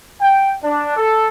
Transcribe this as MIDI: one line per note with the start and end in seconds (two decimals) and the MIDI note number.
0.21 0.54 79
0.64 0.95 62
0.97 1.29 69